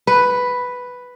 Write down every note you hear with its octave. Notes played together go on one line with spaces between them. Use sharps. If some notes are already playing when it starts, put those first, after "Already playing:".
B4